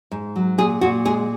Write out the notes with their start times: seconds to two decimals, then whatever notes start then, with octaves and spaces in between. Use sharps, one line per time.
0.12 G#2
0.36 F#3
0.58 A#2 G#4
0.81 A#2 F#4
1.05 G#3 G#4